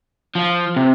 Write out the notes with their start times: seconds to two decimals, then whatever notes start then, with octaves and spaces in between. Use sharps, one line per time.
0.35 F3
0.76 C3